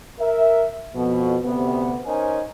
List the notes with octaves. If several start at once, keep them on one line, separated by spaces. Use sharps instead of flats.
A#4 E5
F2 B2
D2 C3 B3
C#4 D#4 A#4 C5 G#5